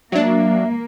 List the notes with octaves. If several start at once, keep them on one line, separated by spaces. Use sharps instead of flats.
F#3 A#3 D4 E5